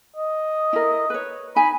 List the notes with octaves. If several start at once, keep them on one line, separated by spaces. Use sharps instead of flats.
D#5
E4 A#4
B4 C#5
D#4 G#5 B5